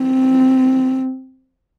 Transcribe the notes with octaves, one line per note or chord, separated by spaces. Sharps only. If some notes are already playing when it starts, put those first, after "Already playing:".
Already playing: C4